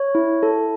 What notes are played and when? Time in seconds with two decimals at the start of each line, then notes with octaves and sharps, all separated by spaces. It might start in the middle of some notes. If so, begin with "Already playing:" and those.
Already playing: C#5
0.15 E4
0.43 A4